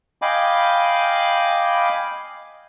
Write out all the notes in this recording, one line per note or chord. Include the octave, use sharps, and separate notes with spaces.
D#5 F5 G5 G#5 B5 D6